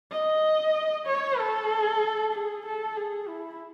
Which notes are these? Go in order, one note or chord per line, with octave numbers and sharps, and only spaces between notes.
D#5
C#5
A4
G#4
A4
G#4
E4